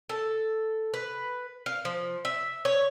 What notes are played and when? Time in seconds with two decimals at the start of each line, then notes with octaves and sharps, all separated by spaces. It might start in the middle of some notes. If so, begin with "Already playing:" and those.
0.09 A4
0.94 B4
1.66 F5
1.85 F3
2.25 E5
2.65 C#5